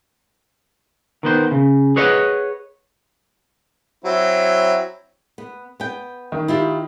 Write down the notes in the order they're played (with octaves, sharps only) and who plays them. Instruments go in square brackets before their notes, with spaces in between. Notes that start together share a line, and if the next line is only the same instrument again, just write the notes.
[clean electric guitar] D#3 B3 C5
C#3
G#4 B4 C#5 D#5 F#5
[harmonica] F#3 C4 E4
[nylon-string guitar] B3
B3 G5
[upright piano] D#3
[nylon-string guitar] E4 F4 G4